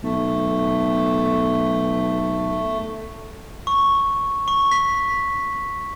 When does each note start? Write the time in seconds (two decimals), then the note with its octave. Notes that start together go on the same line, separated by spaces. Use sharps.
0.04 B1 A3
3.67 C#6
4.48 C#6
4.72 B6